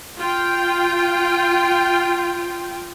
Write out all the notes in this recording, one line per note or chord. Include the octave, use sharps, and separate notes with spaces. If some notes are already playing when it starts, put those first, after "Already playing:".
F4 G5